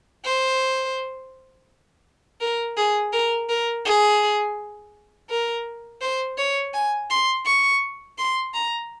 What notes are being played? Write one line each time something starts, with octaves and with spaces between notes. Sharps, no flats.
C5
A#4
G#4
A#4
A#4
G#4
A#4
C5
C#5
G#5
C6
C#6
C6
A#5